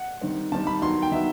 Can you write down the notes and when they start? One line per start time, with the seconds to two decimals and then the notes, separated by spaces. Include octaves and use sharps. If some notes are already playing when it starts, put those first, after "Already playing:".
Already playing: F#5
0.21 D#3 G3 C4
0.52 D#3 G3 C4 A5
0.67 B5
0.82 D#3 F#3 B3 C6
1.02 G5
1.12 D#3 F#3 B3 E5